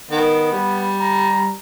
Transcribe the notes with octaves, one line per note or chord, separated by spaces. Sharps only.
D#3 B3
G3
A#5